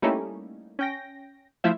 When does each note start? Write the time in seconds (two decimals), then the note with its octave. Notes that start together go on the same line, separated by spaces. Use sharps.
0.02 G3 A3 A#3 C#4 D#4 E4
0.79 C#4 G5 A#6
1.64 F3 A3 E4 F4 C5 E5